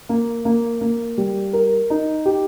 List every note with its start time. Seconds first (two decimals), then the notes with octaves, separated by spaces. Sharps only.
0.09 A#3
0.45 A#3
0.81 A#3
1.18 G3
1.53 A#4
1.90 D#4
2.26 G4